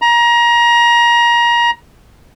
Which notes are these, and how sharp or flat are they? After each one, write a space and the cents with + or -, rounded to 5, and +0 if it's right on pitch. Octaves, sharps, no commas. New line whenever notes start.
A#5 +25